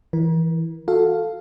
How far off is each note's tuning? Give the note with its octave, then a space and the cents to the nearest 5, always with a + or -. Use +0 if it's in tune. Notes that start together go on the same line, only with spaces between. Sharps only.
E3 -5 A#4 +35
F#4 -25 A4 +0 F5 +0